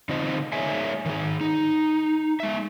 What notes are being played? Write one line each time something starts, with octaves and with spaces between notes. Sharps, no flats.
D3 C4 D#4 F4 C5 D#5
G#3 A#3 G#4 C#5 E5 G#5
D#3 G#4
D#4
G#3 E5